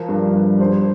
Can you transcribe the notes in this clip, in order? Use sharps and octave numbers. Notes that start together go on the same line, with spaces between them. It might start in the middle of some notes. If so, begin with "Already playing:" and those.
Already playing: F3 A#4
G2
G2
G2 C5